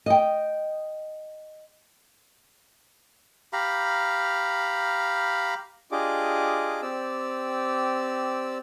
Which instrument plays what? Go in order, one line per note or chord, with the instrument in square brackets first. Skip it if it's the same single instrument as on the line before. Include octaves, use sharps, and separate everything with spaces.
[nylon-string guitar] D#5 G5
[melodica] G4 F5 A#5 B5
[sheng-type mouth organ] D4 F4 G4 G#4 D#5 D6
C4 G4 D5 E6